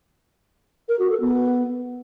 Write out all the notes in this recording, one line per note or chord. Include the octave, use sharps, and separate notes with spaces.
A#4
F#4
A4
B3